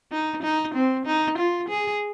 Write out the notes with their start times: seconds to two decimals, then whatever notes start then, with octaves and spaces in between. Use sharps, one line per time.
0.12 D#4
0.43 D#4
0.75 C4
1.06 D#4
1.39 F4
1.69 G#4